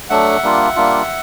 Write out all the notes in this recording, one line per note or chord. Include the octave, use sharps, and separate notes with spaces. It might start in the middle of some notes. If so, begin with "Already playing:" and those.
F#3 A3 D4 E5 F#5
G3 A#3 D4 F4
G3 A#3 D4 F4